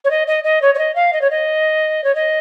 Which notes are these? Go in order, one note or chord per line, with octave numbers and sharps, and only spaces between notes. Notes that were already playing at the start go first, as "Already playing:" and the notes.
C#5
D#5
D#5
D#5
C#5
C#5
D#5
F5
D#5
C#5
D#5
C#5
D#5